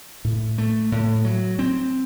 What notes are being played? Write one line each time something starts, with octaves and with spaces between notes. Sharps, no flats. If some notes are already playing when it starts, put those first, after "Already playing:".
A2
A3
A2
F#3
C4